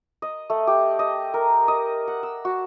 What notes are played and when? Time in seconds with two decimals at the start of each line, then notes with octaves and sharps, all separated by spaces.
0.22 D#5
0.50 A3
0.67 G4
0.99 D#5
1.34 A#4
1.68 D#5
2.08 F#5
2.23 E6
2.45 F#4